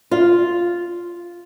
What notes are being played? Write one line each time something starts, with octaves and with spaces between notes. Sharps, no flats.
F4